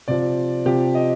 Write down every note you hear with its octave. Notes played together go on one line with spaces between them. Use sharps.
C3 F3 D5
C3 F3 G4
D#5